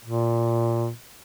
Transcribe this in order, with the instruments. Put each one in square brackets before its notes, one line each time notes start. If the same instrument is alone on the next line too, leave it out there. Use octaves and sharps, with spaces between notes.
[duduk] A#2